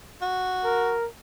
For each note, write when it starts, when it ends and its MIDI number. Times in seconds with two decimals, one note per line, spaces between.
0.21 0.95 66
0.64 1.07 70